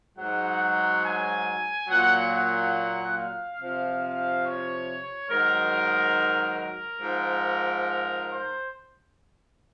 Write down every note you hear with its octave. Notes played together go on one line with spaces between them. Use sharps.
G#2 F#3 F#5
G#5
A#2 F#3 F#5
F#5
F5
C3 F3
F5
C#5
G#2 D#3 F#3 A#4
A#4
G#2 F3
C5